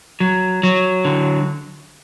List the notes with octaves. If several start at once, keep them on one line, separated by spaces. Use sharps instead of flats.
F#3
F#3
D3